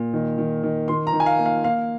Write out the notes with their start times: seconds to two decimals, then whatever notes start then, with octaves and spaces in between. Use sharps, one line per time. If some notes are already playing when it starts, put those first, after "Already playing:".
Already playing: A#2
0.13 D#3
0.38 D#3
0.63 D#3
0.88 D#3 C6
1.07 A#5
1.13 D#3
1.20 G#5
1.26 F5
1.39 A#3
1.46 F5
1.64 A#3 F5